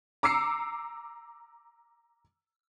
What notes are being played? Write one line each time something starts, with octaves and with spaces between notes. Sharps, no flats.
A#5 D6 E6 C7 C#7